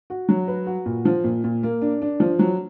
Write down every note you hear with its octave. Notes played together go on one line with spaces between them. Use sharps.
F#4
F#3
B4
F#4
A#2
F3
A#2
A#2
A#3
D4
D4
F3
F#3